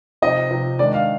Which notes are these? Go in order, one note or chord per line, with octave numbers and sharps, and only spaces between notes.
C3 F3 C4 D#4 D#5
C3 F3 C4 D#4
D#3 G#3 D4 D5
F5